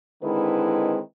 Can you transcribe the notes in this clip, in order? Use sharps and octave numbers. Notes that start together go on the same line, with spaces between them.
D3 D#3 G#3 C4 E4 B4